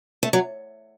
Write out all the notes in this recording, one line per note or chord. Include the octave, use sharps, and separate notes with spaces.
A3
F#3